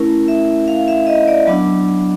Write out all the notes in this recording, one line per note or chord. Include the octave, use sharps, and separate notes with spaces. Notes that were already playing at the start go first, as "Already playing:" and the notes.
Already playing: A3 C#4 E4 A#4
E5
F5
E5
D#5
D5
F#3 B3 D4